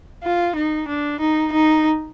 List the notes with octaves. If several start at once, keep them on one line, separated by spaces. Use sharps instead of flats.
F4
D#4
D4
D#4
D#4